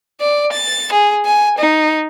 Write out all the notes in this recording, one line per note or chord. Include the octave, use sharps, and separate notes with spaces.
D5
A6
G#4
G#5
D#4